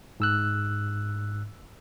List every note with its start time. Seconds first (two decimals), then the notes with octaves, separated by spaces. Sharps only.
0.20 G#2 E6 F#6